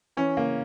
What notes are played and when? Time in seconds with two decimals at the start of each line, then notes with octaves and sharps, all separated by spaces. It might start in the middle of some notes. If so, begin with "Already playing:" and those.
0.17 E3 C#4
0.37 C#3 A#3